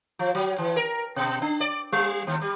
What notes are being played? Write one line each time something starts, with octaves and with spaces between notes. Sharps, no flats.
F3
F#3
E3
A#4
B2
D4
D5
G3
D#2
G3